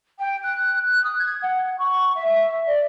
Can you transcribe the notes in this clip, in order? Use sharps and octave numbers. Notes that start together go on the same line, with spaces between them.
G5
F#6
F#6
D#6
G#6
F#5
C#6
E5
D5